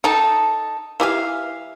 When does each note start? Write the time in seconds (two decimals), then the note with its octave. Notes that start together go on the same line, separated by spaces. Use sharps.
0.04 D#4 A4 G5 A5 A#5
1.00 E3 G4 E5 F5 G#5